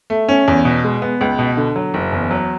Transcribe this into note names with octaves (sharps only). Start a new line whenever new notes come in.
A3
C#4
E2
B2
G#3
B3
C#2
B2
D3
F#3
F#1
E2
F#3